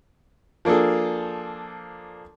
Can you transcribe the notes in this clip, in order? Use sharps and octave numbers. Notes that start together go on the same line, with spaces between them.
F3 A#3 D4 G#4 A4